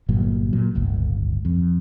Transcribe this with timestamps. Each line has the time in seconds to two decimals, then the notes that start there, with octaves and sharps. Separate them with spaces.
0.09 G1 A#2 F#3
0.53 A#2 F#3
0.75 D1 G1 C#2
1.45 F2